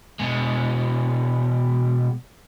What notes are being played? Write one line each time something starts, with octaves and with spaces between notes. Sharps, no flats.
B2 G#3